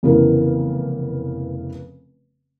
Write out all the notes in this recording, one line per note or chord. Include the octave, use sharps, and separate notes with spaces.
F1 C#3 E3 B3 A#4